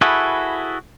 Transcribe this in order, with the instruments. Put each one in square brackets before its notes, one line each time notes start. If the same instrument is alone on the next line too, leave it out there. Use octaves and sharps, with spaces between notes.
[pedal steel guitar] E4 F#4 G#4 A4 B4